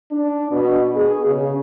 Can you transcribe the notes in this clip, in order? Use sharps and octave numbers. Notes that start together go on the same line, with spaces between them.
D4
B2
G#4
C#3